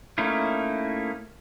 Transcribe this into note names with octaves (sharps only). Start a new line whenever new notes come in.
A3 A#3 C#4 D#4 E4